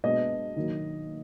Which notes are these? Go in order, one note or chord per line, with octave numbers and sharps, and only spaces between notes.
B2 G#3 B3 D4 D#5
D#3 F#3 A#3